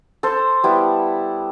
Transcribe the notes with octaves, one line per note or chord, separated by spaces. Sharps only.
A4 C5
G3 B3 E4